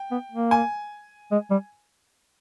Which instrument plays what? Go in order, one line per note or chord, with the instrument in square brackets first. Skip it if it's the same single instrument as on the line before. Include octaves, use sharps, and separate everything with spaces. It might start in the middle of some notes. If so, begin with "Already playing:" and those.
Already playing: [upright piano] G5
[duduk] B3
A#3
[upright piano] G#5
[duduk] G#3
G3